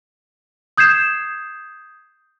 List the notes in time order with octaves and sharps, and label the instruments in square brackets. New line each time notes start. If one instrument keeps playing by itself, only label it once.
[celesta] D#6 G6 G#6 C7 E7